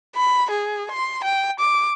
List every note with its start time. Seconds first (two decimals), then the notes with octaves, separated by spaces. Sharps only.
0.16 B5
0.50 G#4
0.91 C6
1.24 G5
1.60 D6